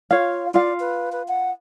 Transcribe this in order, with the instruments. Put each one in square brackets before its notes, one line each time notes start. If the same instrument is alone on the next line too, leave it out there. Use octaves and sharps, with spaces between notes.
[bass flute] F4 [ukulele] C#5 F5
[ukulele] F4 F5 [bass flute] D5
[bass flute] B4
B4
F#5